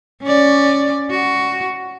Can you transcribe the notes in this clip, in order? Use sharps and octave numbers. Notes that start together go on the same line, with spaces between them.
C#4 D5
F#4